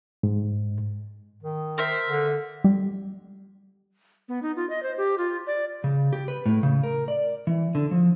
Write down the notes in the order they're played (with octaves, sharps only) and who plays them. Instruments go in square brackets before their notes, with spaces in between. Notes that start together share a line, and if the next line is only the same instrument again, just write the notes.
[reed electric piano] G#2
[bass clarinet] D#3
[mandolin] A#4 C5 E5
[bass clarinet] D3
[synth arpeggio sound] G3
[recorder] B3
D#4
F4
D#5
C5
G4
F4
D5
[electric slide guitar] C#3
G4
B4
A2
C#3
A#4
D5
E3
D3
F3